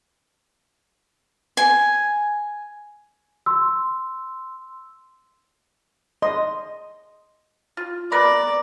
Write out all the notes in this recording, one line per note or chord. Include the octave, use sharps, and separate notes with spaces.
G#5
C6 E6
D#5 C6
F4
B3 A#4 D5 B5 D6